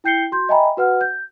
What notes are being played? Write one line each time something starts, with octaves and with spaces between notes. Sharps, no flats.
E4 G5 G6 C7 C#7 G7
F#4 C6 G6
D#5 E5 G5 G#5 A#5 B5
F#4 B4 F#5 F6
G6